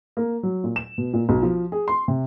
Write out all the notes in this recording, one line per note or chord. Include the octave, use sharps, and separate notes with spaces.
A#3
F#3
A#2
E7
B2
A#2
B1
F3
G#4
C6
C3